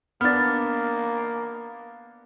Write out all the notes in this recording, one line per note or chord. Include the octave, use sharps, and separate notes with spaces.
A#3 B3 D4 F6 A6